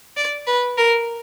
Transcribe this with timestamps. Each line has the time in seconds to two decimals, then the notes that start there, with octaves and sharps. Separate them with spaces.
0.17 D5
0.47 B4
0.78 A#4